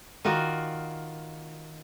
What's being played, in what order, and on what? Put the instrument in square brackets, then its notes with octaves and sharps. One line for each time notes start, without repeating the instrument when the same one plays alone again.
[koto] D#3 F4 F#4 D5 D#5